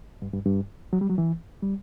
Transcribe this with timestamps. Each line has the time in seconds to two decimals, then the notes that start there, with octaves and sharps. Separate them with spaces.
0.22 G2
0.33 G2
0.46 G2
0.93 F#3
1.01 G3
1.10 F#3
1.18 E3
1.63 G3